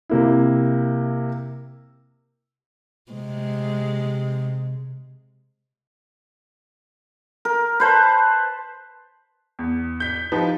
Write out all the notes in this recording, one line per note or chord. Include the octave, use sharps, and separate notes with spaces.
C3 A#3 E4
C3 G#3
A#4
B4 C5 A5
E2
G6 B6
F3 D#4 G4 B4